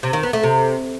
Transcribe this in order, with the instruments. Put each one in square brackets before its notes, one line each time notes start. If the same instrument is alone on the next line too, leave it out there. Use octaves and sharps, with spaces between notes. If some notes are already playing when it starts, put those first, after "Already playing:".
[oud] C3
D#3
B3
A3
C3